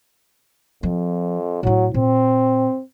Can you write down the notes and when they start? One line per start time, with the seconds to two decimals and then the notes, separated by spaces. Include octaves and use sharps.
0.83 F2 F3 C4
1.63 A2 F#3 E4
1.94 A#2 C4